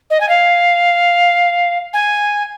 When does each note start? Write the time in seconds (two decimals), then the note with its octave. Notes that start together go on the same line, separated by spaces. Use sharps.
0.10 D#5
0.20 G#5
0.29 F5
1.93 G#5